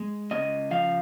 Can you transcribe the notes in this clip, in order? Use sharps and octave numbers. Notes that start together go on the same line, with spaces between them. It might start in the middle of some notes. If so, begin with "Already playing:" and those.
Already playing: G#3
C#3 D#5
F3 F5